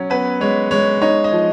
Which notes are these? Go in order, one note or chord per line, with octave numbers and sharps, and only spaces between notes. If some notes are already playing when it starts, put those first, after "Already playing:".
Already playing: F#3 C#4
B3 B4
G#3 C#5
G#3 C#5
D#4 C#5
D#5
F3